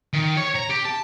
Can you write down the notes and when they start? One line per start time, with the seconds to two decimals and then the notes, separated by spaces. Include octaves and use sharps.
0.13 D#3
0.37 C#5
0.55 A#5
0.69 G4
0.85 A5